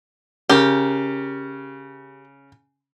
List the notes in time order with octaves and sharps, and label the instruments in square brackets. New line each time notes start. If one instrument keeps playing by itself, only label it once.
[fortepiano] C#3 [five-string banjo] G4 A#4